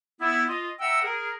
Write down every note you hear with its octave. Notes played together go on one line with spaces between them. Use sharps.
B3 E4
F4 D#5
E5 F#5 G5 A#5 E6
G#4 A#4